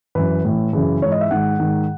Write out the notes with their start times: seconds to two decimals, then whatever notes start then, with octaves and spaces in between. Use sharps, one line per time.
0.15 F#2 E3 B4
0.45 A2 E3
0.73 F#2 C#3 E3
1.02 G#2 E3 C#5
1.12 D#5
1.21 E5
1.31 G#2 D#3 F#5
1.60 G#2 D#3